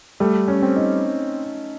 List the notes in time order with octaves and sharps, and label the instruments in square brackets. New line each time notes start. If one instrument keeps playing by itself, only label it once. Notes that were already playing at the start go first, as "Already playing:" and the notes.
[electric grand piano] G3 [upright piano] A3
[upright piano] C#4
[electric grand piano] C4
[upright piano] D#4